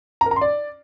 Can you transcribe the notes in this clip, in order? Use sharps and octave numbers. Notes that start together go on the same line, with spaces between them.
A#5
A#4
A#5
C6
D5